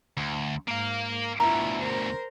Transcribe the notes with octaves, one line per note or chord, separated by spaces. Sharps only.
D2
G#2 A#3 F5
D2 B2 E4 F4 A#5
A#4 C5